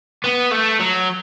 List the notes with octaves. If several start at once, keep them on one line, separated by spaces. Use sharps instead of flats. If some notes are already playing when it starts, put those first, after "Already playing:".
B3
A3
F#3